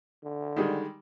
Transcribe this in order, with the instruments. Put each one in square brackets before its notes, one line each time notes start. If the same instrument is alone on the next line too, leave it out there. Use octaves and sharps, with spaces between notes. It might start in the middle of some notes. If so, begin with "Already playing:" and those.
[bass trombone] D3
[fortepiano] D#3 G3 G#3